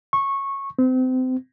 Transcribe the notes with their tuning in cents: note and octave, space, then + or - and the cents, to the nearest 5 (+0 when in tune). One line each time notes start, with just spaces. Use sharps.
C#6 -15
C4 -30